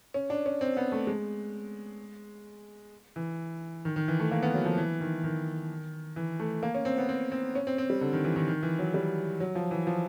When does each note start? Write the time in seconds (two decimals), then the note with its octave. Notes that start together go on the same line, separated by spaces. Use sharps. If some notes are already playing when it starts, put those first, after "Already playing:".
0.14 C#4
0.30 D4
0.46 C#4
0.61 C4
0.77 B3
0.92 A3
1.07 G#3
3.16 E3
3.85 D#3
3.96 D#3
4.08 E3
4.20 A3
4.31 A#3
4.43 B3
4.54 F#3
4.65 F3
4.77 E3
5.01 D#3
5.24 D#3
6.16 E3
6.40 A3
6.63 A#3
6.74 C#4
6.85 C4
6.98 B3
7.09 C4
7.32 C4
7.55 C#4
7.67 C4
7.78 C4
7.90 G3
8.01 D3
8.13 D#3
8.25 E3
8.36 D#3
8.48 D#3
8.63 E3
8.79 F#3
8.94 G3
9.40 F#3
9.55 F3
9.71 E3
9.87 F3